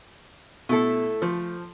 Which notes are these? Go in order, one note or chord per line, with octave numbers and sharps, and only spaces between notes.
B2 A3 E4 A4
F3 A3